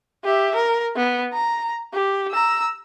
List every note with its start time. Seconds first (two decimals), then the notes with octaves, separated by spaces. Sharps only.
0.24 G4 E5
0.55 A#4
0.96 B3
1.33 A#5
1.93 G4
2.31 A#5 E6